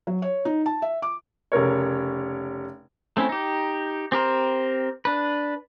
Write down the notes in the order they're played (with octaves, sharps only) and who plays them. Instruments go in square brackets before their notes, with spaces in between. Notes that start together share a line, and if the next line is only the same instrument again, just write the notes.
[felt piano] F#3
C#5
D#4
A5
E5
D6
[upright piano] F1 C#3 A#4 C#5
[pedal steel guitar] A3 C4 C#4 E4
D#4 G4
C4 G4 A#4 C5
D4 B4